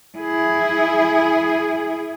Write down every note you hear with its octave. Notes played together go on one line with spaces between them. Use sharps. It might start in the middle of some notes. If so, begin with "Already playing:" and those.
E4 G#4